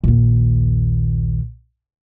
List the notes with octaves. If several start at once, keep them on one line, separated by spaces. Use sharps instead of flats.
A#1 D#2